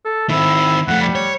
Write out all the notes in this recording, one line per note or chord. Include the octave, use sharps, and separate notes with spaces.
A4
D#3 C4 E4
F2 A3 F#5
G3
C#5